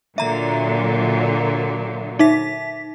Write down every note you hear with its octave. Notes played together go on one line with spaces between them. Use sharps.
A#2 D3 F#3 E5 A#5
D#4 E5 B6